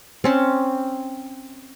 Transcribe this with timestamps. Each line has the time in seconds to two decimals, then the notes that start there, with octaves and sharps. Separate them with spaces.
0.24 C4 C#4 A5